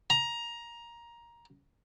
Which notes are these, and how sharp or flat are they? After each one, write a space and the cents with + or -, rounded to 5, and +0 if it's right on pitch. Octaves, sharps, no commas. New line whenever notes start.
A#5 +15